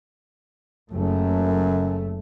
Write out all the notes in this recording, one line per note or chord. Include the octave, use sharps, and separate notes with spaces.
F#1 F#2 A3